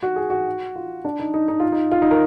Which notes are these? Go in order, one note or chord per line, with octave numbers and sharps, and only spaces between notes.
F#4
G#4
F#4
F4
D4
D#4
D#4
D#4
F4
D#4
F4
D#4
A#4